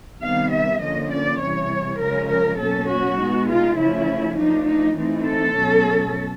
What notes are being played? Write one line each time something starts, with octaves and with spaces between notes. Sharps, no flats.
C3 D#3 G3 B3 F5
E5
D3 F3 A#3 C#4 D#5
D5
C3 E3 G3 C#5
C#3 F3 G#3 C#4 A#4
A#4
B2 F#3 A#3 C#4 A4
F#4
B2 G#3 B3 D#4
F4
C#3 F3 A3 C#4 E4
F3 A3 D4 D#4
D#4
E3 A3 C4 D#4
A4
B2 F#3 A3 C#4